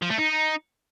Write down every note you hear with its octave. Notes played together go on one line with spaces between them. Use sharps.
F3
A3
D#4